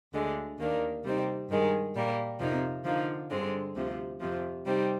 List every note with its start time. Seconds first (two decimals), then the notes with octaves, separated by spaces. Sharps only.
0.13 D2 D3 G#3
0.58 D#2 D#3 A#3 D4
1.03 C3 G3 C4 D#4
1.49 G2 D#3 G#3
1.94 A#2 G3 A#3
2.39 F2 C3 F3 A#3 D#4
2.84 D3 F3 A#3 D#4
3.30 G2 D3 G#3 C4
3.75 D2 C3 F3
4.20 F2 C3 F3
4.65 C3 G3 C4 D#4